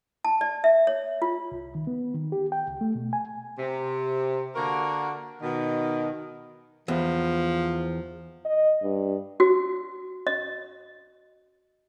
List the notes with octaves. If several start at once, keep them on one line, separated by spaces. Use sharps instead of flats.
A5
D5
E5
C#5
F4
C2
D#3
B3
D#3
G4
G5
C#2
A3
B2
G#5
C3
D3 A#3 F#4 A#4
B2 D#3
E2 F3
D#5
G2
F#4
D#5